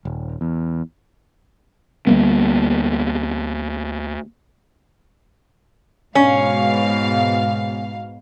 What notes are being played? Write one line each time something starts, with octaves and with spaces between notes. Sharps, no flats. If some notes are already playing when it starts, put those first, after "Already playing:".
D#1
E2
D2 G3 A#3 B3
G#2 B2 C#4 F5